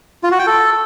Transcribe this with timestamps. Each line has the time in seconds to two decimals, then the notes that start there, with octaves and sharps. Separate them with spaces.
0.23 F4
0.31 F#4
0.39 G5
0.47 A4